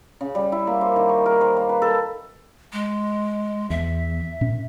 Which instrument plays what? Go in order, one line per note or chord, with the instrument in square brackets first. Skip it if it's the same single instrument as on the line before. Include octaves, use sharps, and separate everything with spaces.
[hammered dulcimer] C#3
G3
E4
A#3
C5
D#3
C#6
A#4
C5
A#3
B4
A4
[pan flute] G#3
[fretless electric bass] E2 [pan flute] E5
[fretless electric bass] A#2 C#4